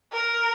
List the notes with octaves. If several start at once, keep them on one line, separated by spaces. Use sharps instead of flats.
A#4